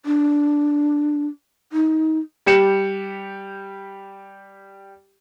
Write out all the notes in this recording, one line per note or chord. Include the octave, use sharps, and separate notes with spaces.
D4
D#4
G3 G4 C#7 E7